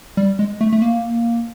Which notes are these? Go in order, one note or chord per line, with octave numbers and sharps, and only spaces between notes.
G3
G#3
A3
A3
A#3